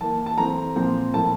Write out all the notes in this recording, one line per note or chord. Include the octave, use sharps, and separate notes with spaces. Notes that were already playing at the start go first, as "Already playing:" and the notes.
E3 A#3 A5
A5
E3 A3 C4 A#5
A#2 F3 C4
A2 F3 A#3 A5